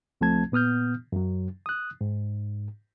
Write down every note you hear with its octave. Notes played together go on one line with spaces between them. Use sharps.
C#2 F3 A3 C4 A5 G#6
A#2 B3 D#6 F6 G6
F#2 F#3
D#6 F#6
G#2